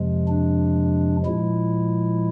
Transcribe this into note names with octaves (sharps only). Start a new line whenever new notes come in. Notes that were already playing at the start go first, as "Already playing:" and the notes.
Already playing: F2 C3 F3 G#3
D4
A#2 F3 G#3 E4